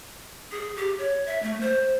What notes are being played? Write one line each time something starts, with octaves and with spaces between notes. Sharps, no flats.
G#4
G4
C#5
E5
A3
C5